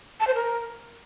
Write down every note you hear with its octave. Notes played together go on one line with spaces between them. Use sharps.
A5
C5
A#4